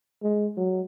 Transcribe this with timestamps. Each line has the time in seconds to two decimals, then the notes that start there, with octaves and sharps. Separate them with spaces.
0.23 G#3
0.57 F#3